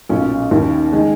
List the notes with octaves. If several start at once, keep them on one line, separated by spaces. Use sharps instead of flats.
B1 A#2 F#3 C#4
D#2 D#3 A#3 C#4
D#3 G#3 D#4